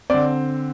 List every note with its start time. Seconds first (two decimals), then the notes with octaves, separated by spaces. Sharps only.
0.10 D3 C4 D5